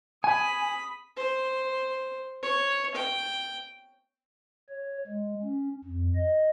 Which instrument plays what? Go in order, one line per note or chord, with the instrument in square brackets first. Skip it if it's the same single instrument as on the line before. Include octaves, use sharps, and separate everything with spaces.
[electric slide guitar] G#5 [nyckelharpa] B5 D#6
[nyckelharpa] C5
C#5
G5
[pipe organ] C#5
G#3
C#4
F2
D#5